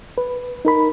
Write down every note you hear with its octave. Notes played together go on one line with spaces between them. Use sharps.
B4
D#4 A#4 B5